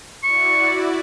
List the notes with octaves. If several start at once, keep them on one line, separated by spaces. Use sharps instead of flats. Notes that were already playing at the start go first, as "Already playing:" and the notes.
E4 F#4 D5 C#6